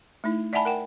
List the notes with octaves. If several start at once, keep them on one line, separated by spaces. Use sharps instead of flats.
A3 D#4 E4
D5 E5 F#5 G#5 A5 B5
A#4 F#5 G5